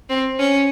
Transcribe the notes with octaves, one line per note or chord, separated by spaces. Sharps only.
C4
C#4